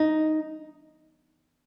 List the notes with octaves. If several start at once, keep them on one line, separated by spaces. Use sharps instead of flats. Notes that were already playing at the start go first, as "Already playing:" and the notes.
Already playing: D#4